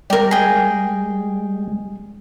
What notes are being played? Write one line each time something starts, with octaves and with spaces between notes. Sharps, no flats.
G3 G#3 G4 A#4
G#4 G5